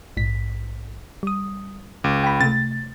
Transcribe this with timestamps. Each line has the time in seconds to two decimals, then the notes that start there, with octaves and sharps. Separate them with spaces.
0.17 A#1 G#2 B6
1.23 G3 D#6
2.04 C#2 D6
2.24 G5 B5
2.41 C3 A3 A6